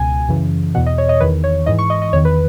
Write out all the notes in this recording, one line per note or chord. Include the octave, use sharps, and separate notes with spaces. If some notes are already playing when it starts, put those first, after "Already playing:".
Already playing: C#2 B2 G#5
F#2 C#3 E3
E2 B2 F#5
D#5
C#5
D#5
E2 D#3 B4
C#5
G#2 E3 D#5
C#6
D#5
D#5
E2 D#3 C#5
B4